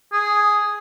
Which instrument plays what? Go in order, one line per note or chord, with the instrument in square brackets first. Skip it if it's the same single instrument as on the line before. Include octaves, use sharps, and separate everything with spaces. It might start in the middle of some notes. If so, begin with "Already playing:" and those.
[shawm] G#4